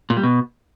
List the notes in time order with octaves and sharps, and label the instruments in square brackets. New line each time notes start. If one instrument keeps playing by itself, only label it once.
[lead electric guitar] A#2
G3
B2